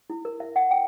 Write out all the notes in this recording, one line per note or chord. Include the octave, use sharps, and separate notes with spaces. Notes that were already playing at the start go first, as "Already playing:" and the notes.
E4
A#4
E5
F#5
G5